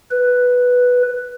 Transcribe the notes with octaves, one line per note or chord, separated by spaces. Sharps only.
B4